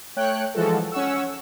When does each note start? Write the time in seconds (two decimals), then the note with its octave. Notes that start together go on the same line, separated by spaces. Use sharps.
0.16 A3 C#5 G5 F#6
0.54 E3 F3 G#3 F#4 A4
0.92 C#4 F#5 C#6 E6